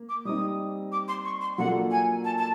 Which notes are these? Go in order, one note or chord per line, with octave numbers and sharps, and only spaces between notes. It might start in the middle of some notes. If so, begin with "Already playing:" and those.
Already playing: A#3
D6
G3 C4 D#4 D#6
D6
C6
C#6
C6
F#3 A#3 D4 F4 A4 F#5
G#5
A5
A5